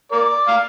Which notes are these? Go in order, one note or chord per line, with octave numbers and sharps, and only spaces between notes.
A#4 D5
F5